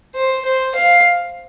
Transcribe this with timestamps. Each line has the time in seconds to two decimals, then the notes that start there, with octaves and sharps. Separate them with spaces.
0.15 C5
0.45 C5
0.75 F5